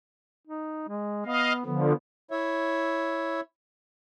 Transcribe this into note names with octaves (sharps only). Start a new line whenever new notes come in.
D#4
G#3
B3 D#5 F5
D3 F3 B3
E4 C#5 E5